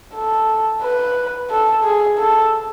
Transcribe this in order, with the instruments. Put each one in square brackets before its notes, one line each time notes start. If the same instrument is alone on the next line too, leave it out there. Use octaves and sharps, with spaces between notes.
[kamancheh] A4
B4
A4
G#4
A4